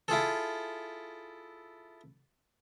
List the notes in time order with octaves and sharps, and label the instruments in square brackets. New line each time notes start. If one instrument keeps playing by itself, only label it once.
[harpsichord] E4 F4 G#4 A4